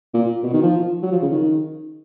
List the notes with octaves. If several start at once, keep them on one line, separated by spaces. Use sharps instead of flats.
A#2
B2
D#3
F3
F#3
F3
C#3
D#3